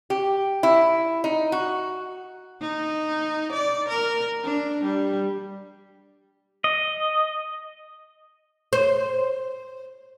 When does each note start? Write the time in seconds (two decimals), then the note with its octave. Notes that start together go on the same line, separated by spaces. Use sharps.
0.10 G4
0.63 E4
1.24 D#4
1.52 F#4
2.61 D#4
3.52 D5
3.89 A#4
4.44 D4
4.84 G3
6.64 D#5
8.73 C5